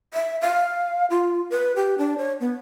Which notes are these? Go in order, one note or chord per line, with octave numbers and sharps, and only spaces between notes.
E5
F5
F4
B4
G4
D4
C#5
B3